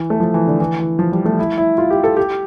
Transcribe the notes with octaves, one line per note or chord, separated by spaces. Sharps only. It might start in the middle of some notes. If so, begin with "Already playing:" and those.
Already playing: E3
A3
F3
E3
D3
E3
E3
F3
G3
A3
E4
E4
F4
G4
A4
G4